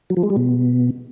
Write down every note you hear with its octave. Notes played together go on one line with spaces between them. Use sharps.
F#3
F3
G#3
G3
B2